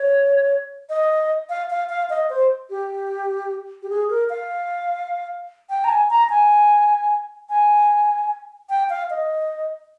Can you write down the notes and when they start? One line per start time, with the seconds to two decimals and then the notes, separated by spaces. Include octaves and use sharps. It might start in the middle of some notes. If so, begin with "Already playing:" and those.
Already playing: C#5
0.90 D#5
1.49 F5
1.70 F5
1.89 F5
2.10 D#5
2.30 C5
2.70 G4
3.83 G4
3.90 G#4
4.10 A#4
4.30 F5
5.70 G5
5.84 A#5
5.89 G#5
6.10 A#5
6.30 G#5
7.49 G#5
8.70 G5
8.90 F5
9.10 D#5